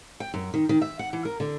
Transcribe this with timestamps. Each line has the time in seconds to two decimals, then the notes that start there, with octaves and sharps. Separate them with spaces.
0.20 G5
0.34 F#2
0.54 D#3
0.69 D#3
0.82 E5
0.99 F#5
1.13 E3
1.25 A#4
1.40 D3